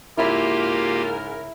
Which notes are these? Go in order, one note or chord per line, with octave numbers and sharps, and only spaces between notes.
G#2 C#3 A#3 E4 F4 G4 A#4 B5